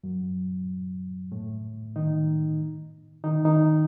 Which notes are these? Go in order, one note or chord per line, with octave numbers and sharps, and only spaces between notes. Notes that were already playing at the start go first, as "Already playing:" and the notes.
F#2 F#3
A2 A3
D#3 D#4
D#3 D#4
D#3 D#4